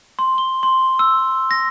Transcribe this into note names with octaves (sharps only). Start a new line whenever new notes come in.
C6
G7
C6
E6
A#6